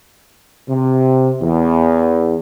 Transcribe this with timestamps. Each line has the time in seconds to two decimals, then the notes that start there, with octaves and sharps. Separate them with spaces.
0.68 C3
1.42 E2